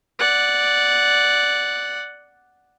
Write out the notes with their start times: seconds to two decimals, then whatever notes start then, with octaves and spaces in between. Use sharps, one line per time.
0.18 D5 F#5